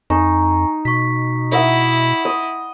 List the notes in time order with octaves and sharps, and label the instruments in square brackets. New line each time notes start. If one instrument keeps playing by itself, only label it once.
[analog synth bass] F2 [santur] D#4 [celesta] G#5 A#5 C#6
[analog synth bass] B2 [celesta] C#6 B6
[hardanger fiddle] E4 [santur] D#5 E5 F#5
[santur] D#5